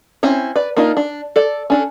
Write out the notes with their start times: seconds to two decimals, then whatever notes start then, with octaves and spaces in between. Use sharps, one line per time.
0.23 C4 C#4 E4 C#5
0.56 B4 D5
0.77 A#3 D4 D#4 F4
0.97 D4
1.36 A4 D5
1.70 C#4 D4 A4